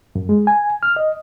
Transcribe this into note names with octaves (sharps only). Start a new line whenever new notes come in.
F#2
G#3
G#5
F6
D#5